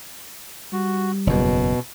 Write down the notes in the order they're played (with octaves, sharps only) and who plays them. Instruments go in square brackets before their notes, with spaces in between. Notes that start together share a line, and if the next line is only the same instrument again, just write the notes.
[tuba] G3 [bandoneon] F#4
[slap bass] F#1 E2 [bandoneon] B2